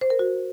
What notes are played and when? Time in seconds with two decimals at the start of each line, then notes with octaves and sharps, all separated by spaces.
0.01 C5
0.10 A#4
0.19 F#4